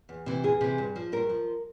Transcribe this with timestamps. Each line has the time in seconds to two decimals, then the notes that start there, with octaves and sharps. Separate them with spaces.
0.09 E2
0.26 C3 E3
0.44 E2 G#4
0.61 C3 E3
0.78 G2
0.96 F3
1.12 G2 A#4
1.29 F3